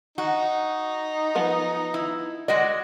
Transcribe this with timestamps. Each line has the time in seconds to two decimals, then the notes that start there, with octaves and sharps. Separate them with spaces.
0.18 D#4 F#4
1.35 F3 B3 F#5
1.94 E4
2.48 G#3 F#4 D5 D#5